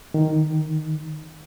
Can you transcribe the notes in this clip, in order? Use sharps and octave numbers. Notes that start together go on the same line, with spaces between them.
D#3